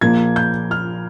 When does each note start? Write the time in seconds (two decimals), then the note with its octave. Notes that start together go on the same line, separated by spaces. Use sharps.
0.01 A#1 A#2 F3 A#3 G#6
0.36 G6
0.71 F6